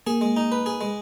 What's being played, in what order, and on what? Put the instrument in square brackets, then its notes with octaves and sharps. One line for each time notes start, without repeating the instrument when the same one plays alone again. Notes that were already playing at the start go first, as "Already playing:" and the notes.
[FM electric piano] A#3 [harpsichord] G#4
[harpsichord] G#3
D#4
B4
G#4
G#3